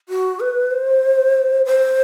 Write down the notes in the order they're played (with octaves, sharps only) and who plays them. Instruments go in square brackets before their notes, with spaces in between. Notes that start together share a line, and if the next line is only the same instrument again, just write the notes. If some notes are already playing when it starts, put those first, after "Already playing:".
[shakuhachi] F#4
B4
C5
C5